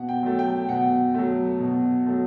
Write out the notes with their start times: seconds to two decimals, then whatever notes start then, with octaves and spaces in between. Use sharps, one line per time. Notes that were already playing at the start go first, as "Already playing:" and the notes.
Already playing: B2 F#5
0.09 G5
0.23 F#3 A3
0.39 G5
0.69 B2 F#5
1.14 F#3 A3
1.60 B2
2.06 F#3 A3